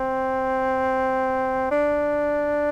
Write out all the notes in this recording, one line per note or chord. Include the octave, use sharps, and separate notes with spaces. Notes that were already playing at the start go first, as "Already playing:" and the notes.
Already playing: C4
D4